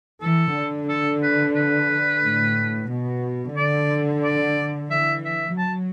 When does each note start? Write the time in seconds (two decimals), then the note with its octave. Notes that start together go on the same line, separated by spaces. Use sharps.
0.21 E3 A4
0.55 D3
0.88 A4
1.23 B4
1.55 B4
2.23 A2
2.90 B2
3.56 D3 D5
4.23 D5
4.91 E3 E5
5.25 E5
5.58 F#3 A5